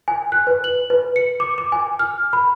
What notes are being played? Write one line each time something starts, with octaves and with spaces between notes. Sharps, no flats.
G#5
F#6
B4
F#7
B4
C#7
D6
D6
G#5
F6
B5